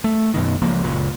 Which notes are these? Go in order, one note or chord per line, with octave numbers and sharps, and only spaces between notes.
A3
F#2 B2 D#3
C#2 F3 A#3
F#1 C#2 A#2